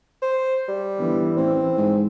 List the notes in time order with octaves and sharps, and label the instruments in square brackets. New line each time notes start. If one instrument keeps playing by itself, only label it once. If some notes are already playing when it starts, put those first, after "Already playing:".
[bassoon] C5
G3
[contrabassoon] G1 [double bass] E3
[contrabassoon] A1 [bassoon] C4
[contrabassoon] G#2